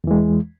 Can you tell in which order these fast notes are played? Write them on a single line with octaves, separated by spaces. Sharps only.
E2 E3 G#3